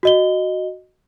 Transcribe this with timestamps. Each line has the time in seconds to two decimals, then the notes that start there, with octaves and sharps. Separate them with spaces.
0.03 F#4 D#5 G7